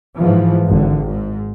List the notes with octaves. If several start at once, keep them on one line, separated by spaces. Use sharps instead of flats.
G#2 E3 F3
G#1 D3
G#2